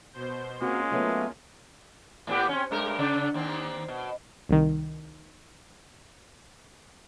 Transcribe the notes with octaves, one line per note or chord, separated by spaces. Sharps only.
B2 C5 G6
G#3 A#3 C4 C#4 F4 F#4
F#3 A3 B3
A2 B3 G4
C4 C#4
G2 G#3 A#4
C#3 D4
D#2 C4
B2
C2 D#3